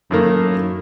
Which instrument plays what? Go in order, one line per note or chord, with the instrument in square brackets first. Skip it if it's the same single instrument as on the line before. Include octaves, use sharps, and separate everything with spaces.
[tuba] F#2 [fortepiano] A2 D#3 A#3